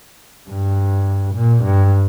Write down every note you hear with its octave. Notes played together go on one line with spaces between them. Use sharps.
G2
A#2
G2